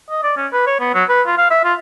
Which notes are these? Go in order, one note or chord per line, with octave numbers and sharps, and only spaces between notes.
D#5
D5
C#4
B4
C#5
B3
F#3
B4
F4
F5
E5
F4